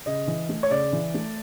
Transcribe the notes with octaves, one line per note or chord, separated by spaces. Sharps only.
C#3 D#5
E3
A3
C#5
C#3 D5
E3
A3